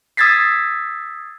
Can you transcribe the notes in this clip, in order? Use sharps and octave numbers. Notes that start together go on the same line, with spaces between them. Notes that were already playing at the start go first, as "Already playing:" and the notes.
D#6 E6 G#6 A6 B6 C7